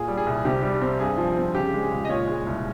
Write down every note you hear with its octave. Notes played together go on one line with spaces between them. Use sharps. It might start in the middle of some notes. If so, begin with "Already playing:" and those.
Already playing: A#2 G#4
G3
G#4
C2
C3 G4
G3
C4
G2 G#4
F3
C4
C#3 G4
G#3
G#4
C#2
D#5
A#2 C#5
G#3
C2